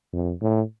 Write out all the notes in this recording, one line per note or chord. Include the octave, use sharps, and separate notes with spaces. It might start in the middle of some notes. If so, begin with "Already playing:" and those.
F2
A2